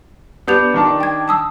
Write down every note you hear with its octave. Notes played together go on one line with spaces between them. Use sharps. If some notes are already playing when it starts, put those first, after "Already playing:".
B3 D4 G4 G6 F7
D#3 D4 A5
G5 G#6
A5 D#6 E6